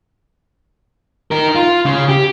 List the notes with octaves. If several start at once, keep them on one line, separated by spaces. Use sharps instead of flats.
D#4 A#4
F4
C#3
G4